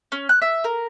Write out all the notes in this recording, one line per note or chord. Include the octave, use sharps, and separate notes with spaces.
C#4
F#6
E5
A#4